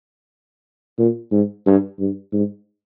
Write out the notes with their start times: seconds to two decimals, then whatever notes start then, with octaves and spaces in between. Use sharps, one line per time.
0.99 A#2
1.32 G#2
1.66 G2
1.99 G2
2.33 G#2